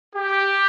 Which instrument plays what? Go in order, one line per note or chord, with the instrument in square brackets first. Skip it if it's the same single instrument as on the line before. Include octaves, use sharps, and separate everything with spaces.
[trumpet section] G4